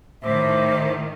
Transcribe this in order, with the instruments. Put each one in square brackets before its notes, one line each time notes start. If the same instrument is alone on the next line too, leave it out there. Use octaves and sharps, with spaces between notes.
[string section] A2 D#3 [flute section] C5 E5 D6